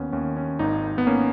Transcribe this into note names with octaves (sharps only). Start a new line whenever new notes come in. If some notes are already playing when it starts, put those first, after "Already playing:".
Already playing: D#2 B3 C#4
D#2 C#4
C#4
G#1 D#4
B3
A#3 C#4